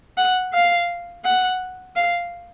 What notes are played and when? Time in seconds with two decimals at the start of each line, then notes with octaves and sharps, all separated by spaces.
0.18 F#5
0.54 F5
1.25 F#5
1.96 F5